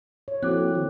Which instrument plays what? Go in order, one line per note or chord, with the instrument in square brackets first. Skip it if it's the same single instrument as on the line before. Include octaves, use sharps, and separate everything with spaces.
[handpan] C#5
[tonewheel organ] F3 A#3 F#4 [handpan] C4 E4 [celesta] A4 D6 F#6
[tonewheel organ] D#3 [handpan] E3